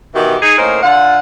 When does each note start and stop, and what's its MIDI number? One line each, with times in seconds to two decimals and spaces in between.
0.15 0.36 47
0.15 0.36 51
0.15 0.36 52
0.15 0.36 63
0.15 0.36 66
0.15 0.36 67
0.42 0.57 63
0.42 0.57 68
0.58 0.77 45
0.58 0.77 58
0.58 0.77 61
0.58 0.77 63
0.58 0.77 70
0.58 0.77 72
0.82 1.19 50
0.82 1.19 65
0.82 1.19 78